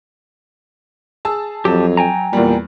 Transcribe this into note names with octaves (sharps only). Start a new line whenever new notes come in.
G#4 A5 E6
F2 F#3 G4 A5
G5 G#5 A#5
E2 A#2 G3